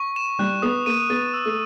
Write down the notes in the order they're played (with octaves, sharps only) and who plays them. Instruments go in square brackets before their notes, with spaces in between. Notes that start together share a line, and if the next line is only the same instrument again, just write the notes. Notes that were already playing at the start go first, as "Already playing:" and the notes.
Already playing: [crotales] C#6
E7
[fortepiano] G3 [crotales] F#6
[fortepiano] B3 [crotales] D#6
[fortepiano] A#3 [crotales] D#7
[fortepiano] B3 [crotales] A6
[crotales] E6
[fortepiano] A3